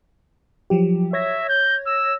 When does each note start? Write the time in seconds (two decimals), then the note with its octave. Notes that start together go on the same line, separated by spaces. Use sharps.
0.70 F3 F#3 G4
1.13 C#5 E5 G#6 A#6
1.49 G6
1.86 E6